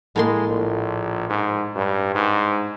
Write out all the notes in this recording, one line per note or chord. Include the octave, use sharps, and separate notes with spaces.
A2 G#3 A#3 C6
A#1
G#2
G2
G#2